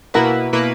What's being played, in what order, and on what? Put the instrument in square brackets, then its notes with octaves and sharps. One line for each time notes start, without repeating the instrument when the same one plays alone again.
[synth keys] B2 A#3 E4 B4 [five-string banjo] F#4 A#4
[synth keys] B2 A#3 E4 B4